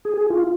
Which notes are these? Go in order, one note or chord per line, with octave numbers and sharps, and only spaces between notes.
G#4
G#4
F4